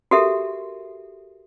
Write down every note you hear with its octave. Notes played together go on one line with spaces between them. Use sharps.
F#4 G4 A4 A#4 E5